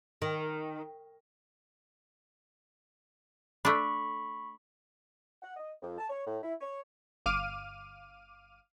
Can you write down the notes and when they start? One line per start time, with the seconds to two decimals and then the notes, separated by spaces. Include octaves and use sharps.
0.22 D#3
3.65 A3 D4 B5 C#6
5.42 F#5
5.57 D#5
5.82 F2
5.98 A5
6.09 C#5
6.27 A2
6.42 E4
6.60 C#5
7.26 G1 F5 D6 F6 D#7